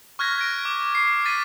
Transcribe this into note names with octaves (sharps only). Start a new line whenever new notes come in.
C#6 F6 F#6 G#6 A#6 B6
G#6 A#6 D7
D6
C7
A6 B6 D#7